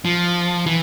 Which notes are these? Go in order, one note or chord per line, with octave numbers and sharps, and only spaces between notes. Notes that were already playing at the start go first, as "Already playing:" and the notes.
F3
E3